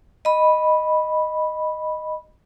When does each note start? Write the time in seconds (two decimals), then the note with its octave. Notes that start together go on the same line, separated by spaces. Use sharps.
0.25 D#5 B5